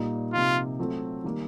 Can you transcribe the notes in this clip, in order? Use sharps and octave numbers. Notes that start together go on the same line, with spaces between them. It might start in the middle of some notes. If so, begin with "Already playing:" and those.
Already playing: A#2 G3 A#3 D#4
C3 F3 A#3 D#4 F4
F#3 A3 C4 F4
D#3 G3 A#3